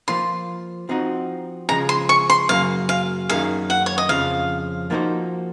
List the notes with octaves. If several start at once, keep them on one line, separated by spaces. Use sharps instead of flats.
F3 A#3 F4 C5 C6
F3 C4 D#4 F#4
C#3 F3 G#3 A#5
C6
C#6
C6
F#2 C#3 F#3 A#3 F5
F5
F#2 D#3 A#3 C#4 G#4 F5
F#5
C#5
D#5
F2 C#3 F3 F5
F3 A#3 D#4 F#4 C5